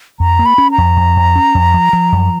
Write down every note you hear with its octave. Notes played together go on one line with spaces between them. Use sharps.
F2 A#5
A#3
B5
C#4
A#5
F2
F2
F2
C#4
F2
F3
F3
F#2